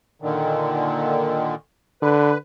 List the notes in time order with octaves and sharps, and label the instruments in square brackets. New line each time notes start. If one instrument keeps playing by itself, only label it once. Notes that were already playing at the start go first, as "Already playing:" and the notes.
[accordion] A#2 D3 D#3
[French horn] D3 [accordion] B4